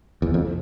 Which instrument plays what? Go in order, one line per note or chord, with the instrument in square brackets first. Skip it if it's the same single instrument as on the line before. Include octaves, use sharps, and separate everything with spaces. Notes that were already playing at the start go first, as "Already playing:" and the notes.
[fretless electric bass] E2
[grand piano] F1 [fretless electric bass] F2